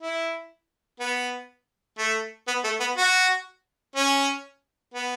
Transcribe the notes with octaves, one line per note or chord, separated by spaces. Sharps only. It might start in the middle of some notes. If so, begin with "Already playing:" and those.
E4
B3
A3
B3
A3
B3
F#4
C#4
B3